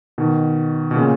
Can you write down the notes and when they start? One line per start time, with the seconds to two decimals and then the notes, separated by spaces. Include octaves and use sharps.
0.18 B2 D#3
0.91 B2
0.95 A#2 C#3